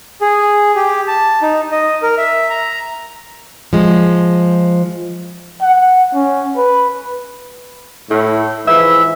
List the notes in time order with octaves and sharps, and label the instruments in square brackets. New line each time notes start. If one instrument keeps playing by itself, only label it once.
[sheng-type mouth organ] G#4
G4
A5
D#4
D#5
A#4
E5
A#5
[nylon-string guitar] F3 G#3
[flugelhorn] F#5
C#4
B4
[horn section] A2
G#2 E3 F3 E5